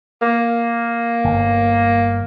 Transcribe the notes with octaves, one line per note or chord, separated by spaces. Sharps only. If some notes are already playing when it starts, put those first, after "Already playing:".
A#3
G1